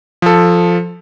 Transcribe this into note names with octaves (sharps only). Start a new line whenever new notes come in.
F3 A4